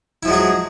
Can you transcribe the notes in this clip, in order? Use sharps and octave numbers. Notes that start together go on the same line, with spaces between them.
F3 F#3 G#3 E4 G#4